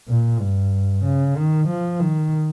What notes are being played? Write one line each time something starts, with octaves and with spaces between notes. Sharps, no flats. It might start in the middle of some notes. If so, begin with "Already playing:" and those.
A#2
G2
C#3
D#3
F3
D#3